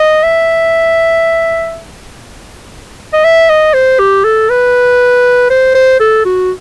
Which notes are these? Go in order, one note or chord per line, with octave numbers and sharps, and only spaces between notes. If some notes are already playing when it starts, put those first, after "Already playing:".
Already playing: D#5
E5
D#5
E5
D#5
C5
G4
A4
B4
C5
C5
A4
F#4